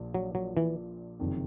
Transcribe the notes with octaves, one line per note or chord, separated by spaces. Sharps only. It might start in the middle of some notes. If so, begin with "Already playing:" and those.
Already playing: A#1 A#2 F3
F#3
F#3
E3
F#1 F2 C3 D#3